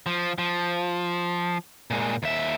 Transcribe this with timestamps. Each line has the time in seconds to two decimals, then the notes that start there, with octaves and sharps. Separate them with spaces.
0.06 F3
0.38 F3
1.91 A#2 G#3
2.23 D#2 E5